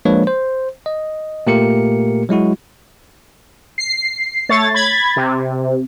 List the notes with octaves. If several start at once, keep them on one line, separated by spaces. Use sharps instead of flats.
F3 G#3 A#3 D4 B4 C#5
C5
D#5
A#2 A3 A#3 G4 A#4 C#7
F#3 G#3 E4 F#4
C7
A3 C#5 A6
B5 G#6 A6
C3